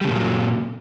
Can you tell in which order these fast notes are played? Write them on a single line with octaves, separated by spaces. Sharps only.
G3 C#3 A#3 A#2 F#3